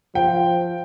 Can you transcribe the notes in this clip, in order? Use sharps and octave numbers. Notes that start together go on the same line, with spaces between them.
F3 G5